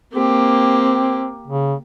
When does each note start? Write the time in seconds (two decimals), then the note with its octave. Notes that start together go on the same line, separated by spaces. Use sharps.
0.13 A#3 C4 G4
1.47 C#3